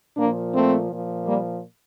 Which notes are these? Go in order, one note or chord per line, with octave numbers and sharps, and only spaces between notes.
A#2 F3 A#3 D4
A3 C4
A#2 F3
G3 A#3